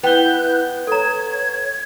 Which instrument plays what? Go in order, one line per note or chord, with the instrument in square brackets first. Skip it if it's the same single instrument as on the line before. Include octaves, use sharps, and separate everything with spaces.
[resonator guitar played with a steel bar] B3 [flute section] E4 F#6 G6 [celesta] B4 G7 [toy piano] G5
[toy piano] A4 A#5 [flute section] C#5 G#6